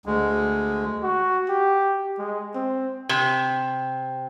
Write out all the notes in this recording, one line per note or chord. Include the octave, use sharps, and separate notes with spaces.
D2 G#3
F#4
G4
G#3
C4
C3